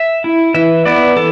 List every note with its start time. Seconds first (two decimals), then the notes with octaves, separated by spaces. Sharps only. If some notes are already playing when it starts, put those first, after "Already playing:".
Already playing: E5
0.24 E4
0.54 E3 E5
0.85 B3 E4 D5
1.16 E3 A4